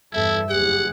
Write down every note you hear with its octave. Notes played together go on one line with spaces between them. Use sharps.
E2 G2 E4 A4 E5
F#1 E2 G4 G#4 F#5